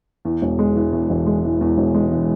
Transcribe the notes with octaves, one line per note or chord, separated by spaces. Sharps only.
E2
E1
G#3
E3
E2
E1
G#3
E3
E2
E1
G#3
E3